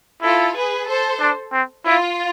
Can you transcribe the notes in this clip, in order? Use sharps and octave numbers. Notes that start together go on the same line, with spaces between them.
E4 F4 A4
G#4 B4
A4 C5
D4
C4
E4 F4